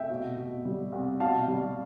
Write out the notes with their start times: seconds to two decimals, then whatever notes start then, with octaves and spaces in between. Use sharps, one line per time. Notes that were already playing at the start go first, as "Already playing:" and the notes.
Already playing: F1 E5 G5
0.10 B2
0.37 B2
0.65 G3
0.92 C2
1.20 B2 F5 A5
1.48 G3